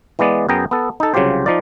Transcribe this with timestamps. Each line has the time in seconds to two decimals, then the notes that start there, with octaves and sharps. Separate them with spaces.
0.19 E3 G#3 B3 D5
0.49 F#2 B3 G#4 G5 A#5
0.71 B3 A4
1.00 D#4 A4
1.14 C2 C#3 F#3 F4 G4 C5
1.46 F3 D#4 F4 D5